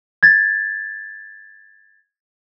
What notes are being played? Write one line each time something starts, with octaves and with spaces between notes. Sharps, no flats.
G#6 A6